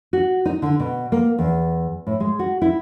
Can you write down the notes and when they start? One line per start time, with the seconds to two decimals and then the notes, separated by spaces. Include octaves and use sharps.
0.13 F#4
0.45 D#4
0.62 D3
0.80 B2
1.12 A#3
1.39 E2
2.07 A2
2.20 G#3
2.39 F#4
2.62 E4